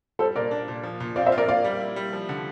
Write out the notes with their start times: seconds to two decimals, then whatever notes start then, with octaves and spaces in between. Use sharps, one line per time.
0.19 G3 A4 C5
0.35 A#2 A#4 D5
0.51 D4
0.68 A#2
0.83 F3
1.00 A#2
1.16 C4 D5 F5
1.26 C5 E5
1.32 F4
1.38 A#4 D5
1.48 A#3 D5 F5
1.64 G3
1.80 E4
1.96 G3
2.13 F3
2.29 D3